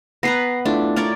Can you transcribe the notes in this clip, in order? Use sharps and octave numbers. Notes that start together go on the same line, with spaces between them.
B3 B4 A#5 A#6 C7
A3 D4 E4 F4
A#4 C#5 D5